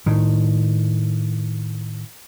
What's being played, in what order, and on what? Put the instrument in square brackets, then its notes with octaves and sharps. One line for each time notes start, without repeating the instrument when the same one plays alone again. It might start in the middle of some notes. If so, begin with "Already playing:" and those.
[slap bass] A2 D#3